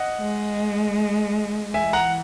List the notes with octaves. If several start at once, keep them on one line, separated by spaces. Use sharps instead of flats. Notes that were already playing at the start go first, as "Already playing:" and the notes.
Already playing: D#5 F#5
G#3
E3 E5 G#5
F#5 A#5